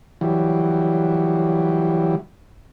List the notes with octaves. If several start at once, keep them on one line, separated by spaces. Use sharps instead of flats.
E3 F#3 G3